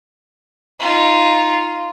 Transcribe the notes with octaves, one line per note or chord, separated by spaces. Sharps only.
D#4 F4